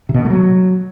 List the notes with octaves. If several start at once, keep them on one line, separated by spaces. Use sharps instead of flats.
C3
B2
D3
A3
F#3